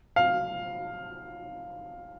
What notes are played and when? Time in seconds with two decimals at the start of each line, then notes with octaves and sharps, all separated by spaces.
0.16 F5